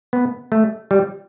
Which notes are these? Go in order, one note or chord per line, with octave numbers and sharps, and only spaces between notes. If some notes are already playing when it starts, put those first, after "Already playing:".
B3
A3
G3